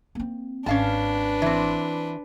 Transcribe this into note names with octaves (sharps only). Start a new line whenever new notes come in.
A#3 C4
G#1 C#4 D4 B4 F5 A5
E3 C4